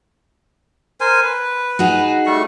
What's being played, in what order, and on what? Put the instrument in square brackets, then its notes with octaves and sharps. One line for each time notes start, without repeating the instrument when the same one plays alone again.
[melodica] A#4 C5 G#5
B4
[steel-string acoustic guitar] D#4 F#4 G#4
[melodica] G3 A3 C#6